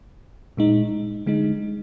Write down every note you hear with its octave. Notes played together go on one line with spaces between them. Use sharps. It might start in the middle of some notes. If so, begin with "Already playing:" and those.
A#2 G#3 D#4
D3 G#3 D#4